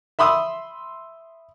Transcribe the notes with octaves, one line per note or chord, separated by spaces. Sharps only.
E5 B5 C6 D#6 E6